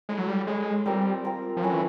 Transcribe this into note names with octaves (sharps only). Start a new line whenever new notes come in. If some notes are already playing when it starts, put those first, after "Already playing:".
G#3 E4 A4 C#5
F#3
G3
G#3 E4 A4 C#5
G3 C4 F4 A#4
C4 F4 A#4
F3
F#3 A3 C#4 E4
E3